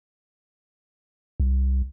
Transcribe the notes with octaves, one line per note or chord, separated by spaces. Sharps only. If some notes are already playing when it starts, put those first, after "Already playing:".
C2